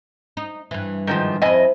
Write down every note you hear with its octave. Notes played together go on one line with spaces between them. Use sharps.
D#4
G2 E3
G#2 D#3 F3
F2 C4 E4 D#5 G#5